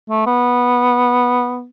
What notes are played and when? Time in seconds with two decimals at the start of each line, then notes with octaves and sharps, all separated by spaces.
0.10 A3
0.27 B3